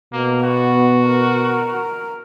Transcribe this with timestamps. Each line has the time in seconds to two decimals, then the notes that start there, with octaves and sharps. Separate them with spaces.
0.13 B2 A#3
0.43 B3 F#4
1.07 A#4